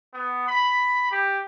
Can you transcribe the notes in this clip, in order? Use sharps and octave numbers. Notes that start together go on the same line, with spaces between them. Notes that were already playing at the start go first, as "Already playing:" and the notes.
B3
B5
G4